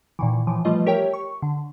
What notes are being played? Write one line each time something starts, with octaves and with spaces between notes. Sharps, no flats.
A#2 D#3 E3
A2 E3 F3
F3 G3 A3 F4 B4 D#5
G4 A#4 C#5 E5 G5
C#6
D3